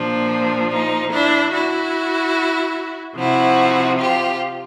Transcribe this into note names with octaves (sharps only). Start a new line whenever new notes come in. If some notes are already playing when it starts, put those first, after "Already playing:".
Already playing: A#2 F3 D4
D#4
D4 E4
E4 F#4
C3 F3 E4 F#4
F4 G4